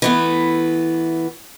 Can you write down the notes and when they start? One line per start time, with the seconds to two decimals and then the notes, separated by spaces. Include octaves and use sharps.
0.02 E3 A3 B3